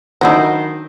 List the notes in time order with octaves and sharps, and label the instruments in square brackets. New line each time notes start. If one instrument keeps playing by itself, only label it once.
[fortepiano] D#3 C5 D#5 [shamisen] F#3 D4 E4